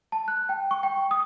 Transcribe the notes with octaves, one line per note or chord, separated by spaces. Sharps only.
A5
F#6
G5
C#6
G5
C#6
D#6